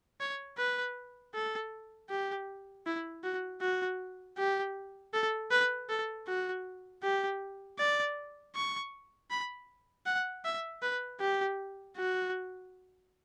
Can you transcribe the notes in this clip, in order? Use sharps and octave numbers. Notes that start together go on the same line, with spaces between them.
C#5
B4
A4
G4
E4
F#4
F#4
G4
A4
B4
A4
F#4
G4
D5
C#6
B5
F#5
E5
B4
G4
F#4